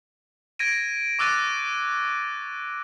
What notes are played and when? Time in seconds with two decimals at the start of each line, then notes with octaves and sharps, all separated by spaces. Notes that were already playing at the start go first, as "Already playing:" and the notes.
0.59 G#6 A#6 D7 D#7
1.19 C#6 D6 E6 F#6 A6 D#7